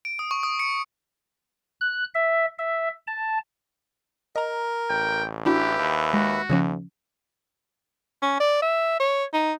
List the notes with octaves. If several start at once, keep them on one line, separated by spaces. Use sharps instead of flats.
D7
D#6
C#6
D#6
C#7
F#6
E5
E5
A5
A#4 D#5 A#5
A1 G5
D4 E4 F#4 G4 B4 E5
D#2
G#3 F#4
D#2 C#3 F3 C#4
C#4
D5
E5
C#5
D#4